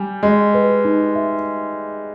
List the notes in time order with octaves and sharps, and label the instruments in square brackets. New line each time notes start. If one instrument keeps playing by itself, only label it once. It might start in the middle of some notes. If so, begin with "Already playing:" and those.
Already playing: [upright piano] G3 [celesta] G#5
[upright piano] G#3 [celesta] D#5
[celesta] B4
D#4
E5